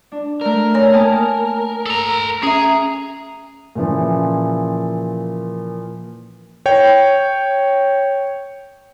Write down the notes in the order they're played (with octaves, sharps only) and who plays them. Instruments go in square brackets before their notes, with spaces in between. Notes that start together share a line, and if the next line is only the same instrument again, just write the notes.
[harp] D4
[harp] A3 D4 [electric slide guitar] A#4
[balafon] C#5 G#5
[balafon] A#3 [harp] G#5 A5 D#6
[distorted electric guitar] A4 A#5
[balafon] C#4 E5 [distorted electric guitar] G#4 [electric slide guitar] A#5
[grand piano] A#2 C#3 E3 F3
[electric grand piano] C#5 G5